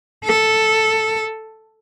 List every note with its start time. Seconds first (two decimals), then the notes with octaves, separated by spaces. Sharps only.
0.25 A4